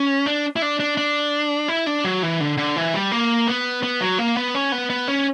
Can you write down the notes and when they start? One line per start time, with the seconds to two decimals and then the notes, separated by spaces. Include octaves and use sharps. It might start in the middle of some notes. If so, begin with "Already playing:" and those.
Already playing: C#4
0.26 D4
0.56 E4
0.62 D4
0.80 D4
0.97 D4
1.68 E4
1.86 D4
2.04 F#3
2.23 E3
2.40 D3
2.58 D3
2.76 E3
2.94 G3
3.11 A#3
3.48 B3
3.83 B3
4.01 F#3
4.19 A#3
4.37 B3
4.55 C#4
4.72 B3
4.90 B3
5.08 C#4